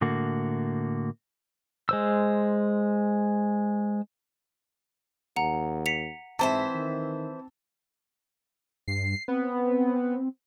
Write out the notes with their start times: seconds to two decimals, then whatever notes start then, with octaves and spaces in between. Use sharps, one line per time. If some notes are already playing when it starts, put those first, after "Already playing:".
0.01 A2 D3 A#3 F#4
1.89 G#3 C5 E6
5.36 D#2 F#5 A#5
5.86 B6 C#7 F7
6.39 G#2 E3 C4 C5 E5 A5
6.75 D#3
8.88 G2 C7
9.28 B3 C4